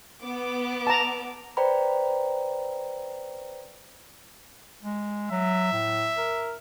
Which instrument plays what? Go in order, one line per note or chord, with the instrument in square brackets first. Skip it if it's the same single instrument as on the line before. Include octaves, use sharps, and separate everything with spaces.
[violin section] B3 D6
[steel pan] A5 A#5
[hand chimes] B4 C5 D5 G5 A#5 B5
[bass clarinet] G#3
[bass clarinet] F#3 [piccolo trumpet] E5
[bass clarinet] A2
A#4